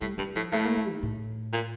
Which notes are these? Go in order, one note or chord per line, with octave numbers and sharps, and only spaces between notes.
A2 G3
G2 G3
A2 F3
A2 A3
A#3
A3
D#3
A2
A#2